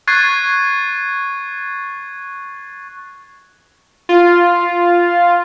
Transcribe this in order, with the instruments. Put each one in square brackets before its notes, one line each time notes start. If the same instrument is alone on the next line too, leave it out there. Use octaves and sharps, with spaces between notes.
[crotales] C#6 F#6 G#6 A6 C7
[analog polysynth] F4